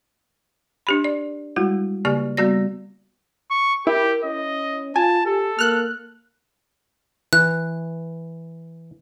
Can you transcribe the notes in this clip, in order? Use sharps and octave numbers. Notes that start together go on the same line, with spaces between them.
D4 G4 B5
D5
G3 G#3 E4 F#4
C#3 A#3 G4 D5 F6
G3 B3 F#4 D5 A#6
C#6
E4 G4 A#4
C#4 D#5
F4 G#5 A5
G4 A4
A#3 F6 F#6
E3 F#6